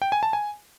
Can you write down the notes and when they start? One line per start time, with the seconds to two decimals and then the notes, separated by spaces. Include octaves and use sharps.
0.02 G5
0.12 G#5
0.23 A5
0.33 G#5